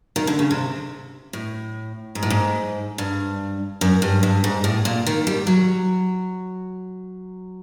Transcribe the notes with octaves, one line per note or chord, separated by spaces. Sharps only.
D#3
D3
C#3
C3
A2
G#2
A2
G#2
G2
F#2
G2
G2
G#2
A2
A#2
D#3
G3
F#3